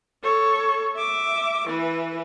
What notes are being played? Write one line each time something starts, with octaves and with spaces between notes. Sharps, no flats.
A4 C#5
E5 D6
E3 B4